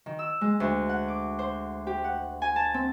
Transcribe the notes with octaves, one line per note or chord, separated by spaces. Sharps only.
D#3
E6
G#3
D2
F#5
D6
C5
G4
F#5
G#5
A5
C4